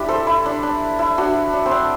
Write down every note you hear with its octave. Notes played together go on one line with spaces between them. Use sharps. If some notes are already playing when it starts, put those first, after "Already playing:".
Already playing: D4 E4 G4
A4 C5
E4
D4
D4
E4
D4 F#4
D4
C4
D4